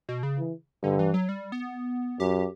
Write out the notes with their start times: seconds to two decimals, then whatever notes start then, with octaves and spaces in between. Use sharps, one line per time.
0.09 B2
0.23 C#3
0.39 E3
0.83 G2 D3
0.99 E3
1.14 F#3
1.29 G3
1.52 B3
2.20 F#2 G4